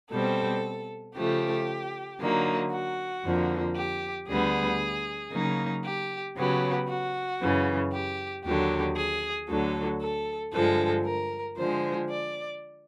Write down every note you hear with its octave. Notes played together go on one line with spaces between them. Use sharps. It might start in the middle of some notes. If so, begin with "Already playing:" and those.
B2 G3 C4 A4
C#3 F3 A3 G4
D3 F#3 A#3 D#4
F#4
F2 D3 F3 A#3
G4
D2 D3 G3 B3 G#4
C#3 F#3 A#3 D#4
G4
C#3 F#3 B3 G4
F#4
F#2 C#3 E3
G4
D#2 D3 F#3 G4
G#4
D2 D3 F#3 A4
A4
G2 D3 F3 G#3 A4
A#4
D3 F3 G#3 C5
D5